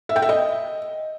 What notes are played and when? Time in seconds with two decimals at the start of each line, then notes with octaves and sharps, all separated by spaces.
0.09 E5
0.16 G5
0.22 E5
0.29 D#5